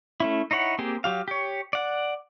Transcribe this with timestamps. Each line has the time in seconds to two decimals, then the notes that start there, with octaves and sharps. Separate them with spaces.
0.20 A3 C#4 E4
0.51 D#4 E4 C#5 F#5
0.79 A#3 C4 G4 G#4
1.04 F#3 G4 F5
1.28 G4 C#5
1.73 D5 F#5